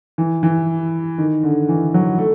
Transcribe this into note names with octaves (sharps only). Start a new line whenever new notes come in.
E3
E3
D#3
D3
E3
F#3
A3